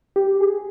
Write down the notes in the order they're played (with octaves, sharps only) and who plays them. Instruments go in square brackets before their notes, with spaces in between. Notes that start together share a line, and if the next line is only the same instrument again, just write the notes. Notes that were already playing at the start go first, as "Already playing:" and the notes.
[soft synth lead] G4
G#4